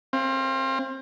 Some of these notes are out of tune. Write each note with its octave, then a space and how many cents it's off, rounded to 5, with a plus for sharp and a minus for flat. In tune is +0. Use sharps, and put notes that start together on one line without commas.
C4 +25 F5 -25